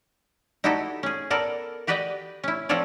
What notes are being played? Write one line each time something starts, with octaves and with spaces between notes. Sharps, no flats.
D#4 E4 F#4 G4 A4
C#4 G#4
B3 A4 A#4 D5
F#4 G4 B4 D5 D#5 G5
C#4 E4
F3 C4 F4 A4 C#5 D5